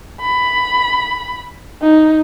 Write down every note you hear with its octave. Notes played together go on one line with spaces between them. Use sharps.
B5
D#4